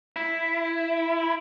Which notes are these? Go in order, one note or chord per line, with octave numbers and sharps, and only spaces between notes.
E4